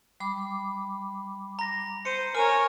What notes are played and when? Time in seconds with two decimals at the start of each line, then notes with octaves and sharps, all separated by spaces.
0.20 G3 B5 D6
1.59 A#5 A#6
2.05 C5 C#7 D#7
2.35 A#4 C#5 G#5 F6 D#7